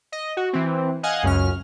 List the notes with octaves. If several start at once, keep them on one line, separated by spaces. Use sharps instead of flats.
D#5
F#4
E3 C4
D#5 F5 F#5 G#5
C#2 F#2 C#4 F6